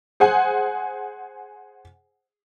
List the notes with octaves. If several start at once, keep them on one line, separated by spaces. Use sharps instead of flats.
G#4 C5 F#5 G#5